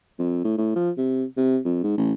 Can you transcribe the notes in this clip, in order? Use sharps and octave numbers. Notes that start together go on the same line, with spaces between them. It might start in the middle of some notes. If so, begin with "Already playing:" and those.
F2
A2
A2
F3
C3
C3
F2
G#2
A1